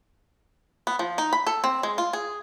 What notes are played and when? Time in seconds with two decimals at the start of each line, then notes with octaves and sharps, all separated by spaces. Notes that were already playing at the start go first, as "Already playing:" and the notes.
0.87 B3
0.99 F3
1.18 D#4
1.33 B5
1.47 A4
1.64 C4
1.83 G#3
1.98 F4
2.13 G#4